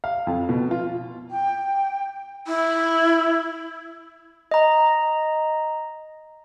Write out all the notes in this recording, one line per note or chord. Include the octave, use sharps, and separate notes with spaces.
F5
F2
B2
F4
G5
E4
D#5 A#5